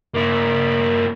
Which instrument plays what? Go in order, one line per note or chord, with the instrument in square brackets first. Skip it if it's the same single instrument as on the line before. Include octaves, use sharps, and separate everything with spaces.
[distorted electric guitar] A#3 E4